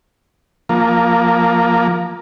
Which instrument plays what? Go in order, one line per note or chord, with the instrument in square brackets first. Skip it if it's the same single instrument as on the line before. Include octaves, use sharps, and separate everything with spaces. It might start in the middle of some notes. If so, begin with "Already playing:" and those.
[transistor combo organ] F3 A#3